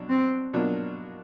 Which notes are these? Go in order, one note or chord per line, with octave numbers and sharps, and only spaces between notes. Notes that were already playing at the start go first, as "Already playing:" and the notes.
Already playing: B2 F#3 D4
C4
B2 F#3 A#3 D4 F4